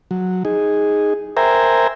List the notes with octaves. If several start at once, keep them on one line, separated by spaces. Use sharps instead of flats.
F#3
D#4 G#4
A#4 C5 E5 G5 G#5 A#5